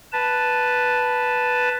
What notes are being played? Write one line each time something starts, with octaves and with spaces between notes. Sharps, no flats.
B4 A5